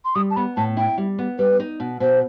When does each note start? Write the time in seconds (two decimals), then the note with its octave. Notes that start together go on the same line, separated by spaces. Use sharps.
0.05 C6
0.15 G3 D#6
0.31 A5
0.36 B3 B5
0.57 A2 A5
0.77 E4 G5
0.98 G3
1.18 B3
1.38 G3 B4
1.60 D#4
1.80 B2
2.00 B2 C5